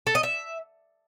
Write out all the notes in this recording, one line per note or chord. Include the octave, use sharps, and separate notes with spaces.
A4
D#5
E5